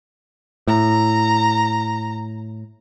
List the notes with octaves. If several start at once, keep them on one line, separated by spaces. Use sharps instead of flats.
A2 A#5